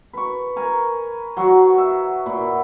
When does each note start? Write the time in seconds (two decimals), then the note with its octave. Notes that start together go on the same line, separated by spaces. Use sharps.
0.13 B4 C#6
0.56 A#4 G#5
1.37 F#3 F#5 C#6
1.78 E5
2.26 A#2 B5